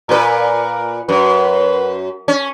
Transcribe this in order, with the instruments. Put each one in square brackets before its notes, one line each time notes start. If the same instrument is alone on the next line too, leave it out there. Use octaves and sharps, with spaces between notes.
[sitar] A#2 B4 [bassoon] A#4
[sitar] F#2 [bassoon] B4
[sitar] C#4